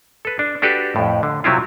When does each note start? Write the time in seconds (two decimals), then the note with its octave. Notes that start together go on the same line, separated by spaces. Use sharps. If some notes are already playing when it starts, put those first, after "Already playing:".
0.25 A4 B4
0.39 D4
0.62 D4 F#4 G4 A4 B4
0.96 F2 A2
1.23 D3
1.44 C3 F#3 C4 E4 F4